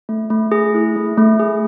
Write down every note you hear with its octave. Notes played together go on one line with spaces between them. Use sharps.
A3
A3
G#4
E4
A3
A3
G#4